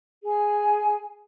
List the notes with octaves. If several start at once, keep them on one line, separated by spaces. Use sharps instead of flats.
G#4 G#5